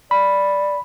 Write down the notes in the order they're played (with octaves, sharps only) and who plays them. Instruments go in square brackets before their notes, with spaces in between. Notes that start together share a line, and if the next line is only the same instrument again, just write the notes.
[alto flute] D5 [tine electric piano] B5